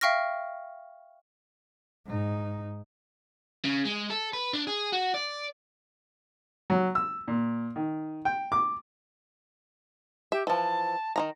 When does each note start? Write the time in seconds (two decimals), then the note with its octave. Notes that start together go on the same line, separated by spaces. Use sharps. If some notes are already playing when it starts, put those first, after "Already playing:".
0.01 E5 F5 G5 C#6 F6 A#6
2.06 G#2 D#4
3.65 C#3
3.85 G#3
4.10 A4
4.33 B4
4.53 D4
4.67 G#4
4.93 F#4
5.15 D5
6.70 F#3
6.95 E6
7.28 A#2
7.76 D#3
8.25 G5
8.52 D6
10.32 G4 E5
10.47 E3 F3 A5
11.16 D#3 F3 A#5